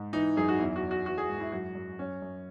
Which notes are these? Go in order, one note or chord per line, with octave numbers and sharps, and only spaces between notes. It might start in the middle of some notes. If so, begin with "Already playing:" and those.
Already playing: G#2
E3 D#4
F#2 G#4
F#4
E2 E4
F#4
E2
F#4
E3 F#4
G#4
G#2
E4
F#2 F#4
F#2
F#2 C#4
F#2